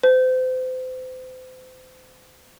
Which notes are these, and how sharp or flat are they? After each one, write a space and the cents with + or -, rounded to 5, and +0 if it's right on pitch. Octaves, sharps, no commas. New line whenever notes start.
C5 -35